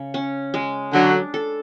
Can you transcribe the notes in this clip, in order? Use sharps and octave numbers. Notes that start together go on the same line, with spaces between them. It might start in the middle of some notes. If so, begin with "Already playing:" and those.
Already playing: C#3
C#4
G#3
D3 F#3 D4
A4